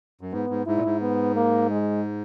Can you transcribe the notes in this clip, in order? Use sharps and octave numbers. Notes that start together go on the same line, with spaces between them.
F#2
G#2 B3
G#2
G#2 E4
A#2
G#2
B3
A#3
G#3